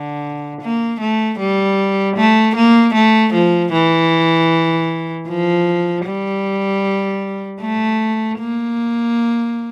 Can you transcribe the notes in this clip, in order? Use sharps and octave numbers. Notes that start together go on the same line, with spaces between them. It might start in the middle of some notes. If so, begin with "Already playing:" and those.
Already playing: D3
A#3
A3
G3
A3
A#3
A3
F3
E3
F3
G3
A3
A#3